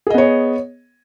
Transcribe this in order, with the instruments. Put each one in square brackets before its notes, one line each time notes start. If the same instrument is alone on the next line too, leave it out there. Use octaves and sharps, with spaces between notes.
[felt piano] G#4
D#5
B3
C#5